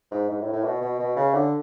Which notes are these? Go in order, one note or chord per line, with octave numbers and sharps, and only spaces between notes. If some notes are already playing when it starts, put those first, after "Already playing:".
G#2
G#2
A2
A2
B2
B2
B2
C#3
D3